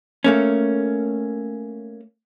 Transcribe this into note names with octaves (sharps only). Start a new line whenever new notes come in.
A3 A#3 C#4